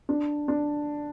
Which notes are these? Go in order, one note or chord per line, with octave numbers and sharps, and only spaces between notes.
D4
D4